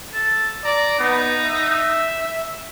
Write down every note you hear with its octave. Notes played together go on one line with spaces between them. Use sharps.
A4
D5 A#5
B3 D#4
E5